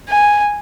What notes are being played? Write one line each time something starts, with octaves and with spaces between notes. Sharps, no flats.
G#5